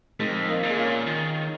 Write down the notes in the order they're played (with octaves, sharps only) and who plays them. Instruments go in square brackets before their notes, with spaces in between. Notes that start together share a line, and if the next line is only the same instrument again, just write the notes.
[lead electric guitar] F2 [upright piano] D#3 G#3
[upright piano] A#3 D#4
[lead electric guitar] A#2
[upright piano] G#4
C#4 F4
[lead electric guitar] D#3